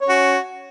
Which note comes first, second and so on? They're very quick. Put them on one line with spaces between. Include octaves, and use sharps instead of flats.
C#5 C#4 F#4